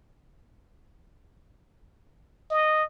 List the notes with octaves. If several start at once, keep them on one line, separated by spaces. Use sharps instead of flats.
D#5